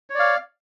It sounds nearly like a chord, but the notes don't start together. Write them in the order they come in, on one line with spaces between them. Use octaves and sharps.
C#5 D5 F5